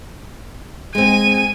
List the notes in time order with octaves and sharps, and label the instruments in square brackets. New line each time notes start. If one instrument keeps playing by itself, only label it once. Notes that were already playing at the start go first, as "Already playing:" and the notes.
[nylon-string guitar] G#3 C4 [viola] G#5